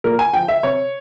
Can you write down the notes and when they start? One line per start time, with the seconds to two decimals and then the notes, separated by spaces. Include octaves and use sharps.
0.04 A#2 A#4
0.19 G#5
0.33 F3 G5
0.48 E5
0.63 C3 C#5